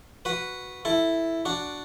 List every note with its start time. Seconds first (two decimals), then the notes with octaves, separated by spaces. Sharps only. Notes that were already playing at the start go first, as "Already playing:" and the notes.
0.25 F#4 B4
0.85 E4 A4
1.45 D4 F#4